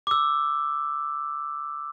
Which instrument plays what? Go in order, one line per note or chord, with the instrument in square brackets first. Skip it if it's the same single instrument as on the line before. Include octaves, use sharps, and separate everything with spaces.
[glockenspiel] D6 E6